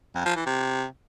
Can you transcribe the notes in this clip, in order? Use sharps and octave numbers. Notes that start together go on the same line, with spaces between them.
F2
F3
E3
C3